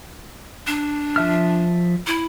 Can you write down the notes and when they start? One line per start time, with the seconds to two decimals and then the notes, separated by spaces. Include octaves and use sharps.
0.67 D4
1.16 F3 E5 F6
2.07 E4